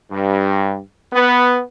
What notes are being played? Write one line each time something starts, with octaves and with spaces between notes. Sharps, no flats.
G2
B3